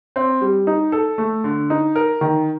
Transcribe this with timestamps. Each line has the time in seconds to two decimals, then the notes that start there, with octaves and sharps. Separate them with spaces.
0.16 C4
0.41 G3
0.67 D#4
0.92 A4
1.18 A3
1.44 D3
1.70 D#4
1.95 A#4
2.21 D#3